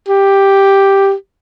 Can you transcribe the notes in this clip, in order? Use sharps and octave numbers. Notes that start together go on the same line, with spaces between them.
G4